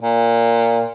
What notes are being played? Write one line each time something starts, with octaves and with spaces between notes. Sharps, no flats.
A#2